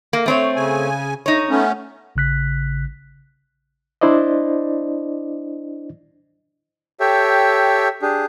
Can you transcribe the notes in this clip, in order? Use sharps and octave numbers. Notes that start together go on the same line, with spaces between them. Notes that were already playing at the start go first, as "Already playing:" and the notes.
A#3
A3 C4 C#5
C#3 G#5
D#4 C#5
A3 B3 C#4
A1 C#3 F#6 B6
D4 E4 C5 D5 D#5
G4 A4 C#5 E5 G5
D4 G4 G#4